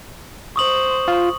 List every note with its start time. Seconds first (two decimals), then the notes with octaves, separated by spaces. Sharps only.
0.56 C5 C#6 D#6 F#7
1.08 F4